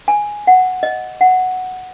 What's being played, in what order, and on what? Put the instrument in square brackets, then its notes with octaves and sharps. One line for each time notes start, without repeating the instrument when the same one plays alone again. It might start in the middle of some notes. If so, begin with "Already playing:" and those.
[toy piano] G#5
F#5
D#5
F#5